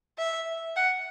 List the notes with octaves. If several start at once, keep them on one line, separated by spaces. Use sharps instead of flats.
E5
F#5